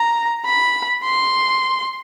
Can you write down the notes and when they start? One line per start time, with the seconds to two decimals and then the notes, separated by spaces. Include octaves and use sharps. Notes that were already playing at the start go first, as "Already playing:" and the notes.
Already playing: A#5
0.45 B5
1.04 C6